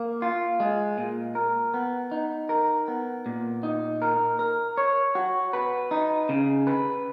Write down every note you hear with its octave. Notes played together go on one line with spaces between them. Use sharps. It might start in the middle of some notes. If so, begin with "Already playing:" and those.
Already playing: A#3
F4
G#3
A#2
A#4
B3
D#4
A#4
B3
A#2
D#4
A#4
A#4
C#5
F#4
B4
D#4
C#3
B4